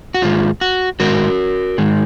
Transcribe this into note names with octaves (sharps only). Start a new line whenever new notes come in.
F#4
G#2 D#3 G#3 F4
F#4
G#2 D#3 G#3 F#4 A#4
G#2 D#3 G#3